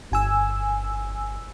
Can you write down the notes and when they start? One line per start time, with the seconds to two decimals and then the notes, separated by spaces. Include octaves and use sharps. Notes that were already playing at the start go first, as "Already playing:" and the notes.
0.12 G1 G#5 E6